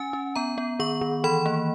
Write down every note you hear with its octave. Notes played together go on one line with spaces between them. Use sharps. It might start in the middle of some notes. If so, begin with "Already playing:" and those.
Already playing: C#4 G#5
C#4
B3 A#5
B3
D#3 C#6
D#3
E3 B5
A#3